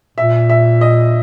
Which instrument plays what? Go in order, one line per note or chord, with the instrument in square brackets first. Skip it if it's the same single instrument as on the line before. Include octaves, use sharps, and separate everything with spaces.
[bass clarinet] A#2 [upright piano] E5
[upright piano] E5
D#5